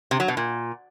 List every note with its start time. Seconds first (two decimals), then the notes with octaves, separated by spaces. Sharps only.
0.11 C3
0.20 F#3
0.28 B2
0.37 A#2